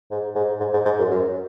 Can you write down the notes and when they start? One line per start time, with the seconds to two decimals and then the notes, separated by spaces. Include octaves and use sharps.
0.11 G#2
0.35 G#2
0.60 G#2
0.74 G#2
0.85 G#2
0.99 F#2
1.11 F#2